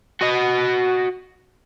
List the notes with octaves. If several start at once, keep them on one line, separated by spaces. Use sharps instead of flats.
F#4 D#5